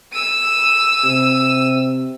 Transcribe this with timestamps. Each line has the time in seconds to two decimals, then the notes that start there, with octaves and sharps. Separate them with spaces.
0.13 E6 D#7
1.04 C3